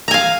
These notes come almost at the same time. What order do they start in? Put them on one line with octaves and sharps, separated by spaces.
A#5 G#5 F5